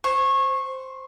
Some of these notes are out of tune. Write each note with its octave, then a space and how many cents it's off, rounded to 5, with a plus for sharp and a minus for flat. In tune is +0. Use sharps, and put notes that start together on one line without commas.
C5 +0 C#6 -20